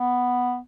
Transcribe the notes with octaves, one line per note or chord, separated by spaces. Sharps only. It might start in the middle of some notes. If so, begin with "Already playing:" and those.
Already playing: B3